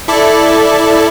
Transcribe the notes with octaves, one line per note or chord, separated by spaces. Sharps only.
E4 A4 D5